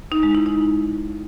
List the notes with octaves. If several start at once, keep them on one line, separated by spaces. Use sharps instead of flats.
D#4
G#3
E4
D#4